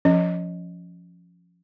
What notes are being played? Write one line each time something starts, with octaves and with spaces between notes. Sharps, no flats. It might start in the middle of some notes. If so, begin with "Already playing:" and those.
F3 C#4 D#5